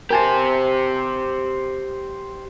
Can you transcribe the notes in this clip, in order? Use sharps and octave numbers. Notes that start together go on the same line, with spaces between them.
G4 A#4 C5 G#5 A5